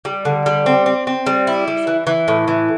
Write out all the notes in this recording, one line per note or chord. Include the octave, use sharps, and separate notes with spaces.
G3
D3
G3
C4
C4
C4
G3
E4
G3
E3
E3
A2
E3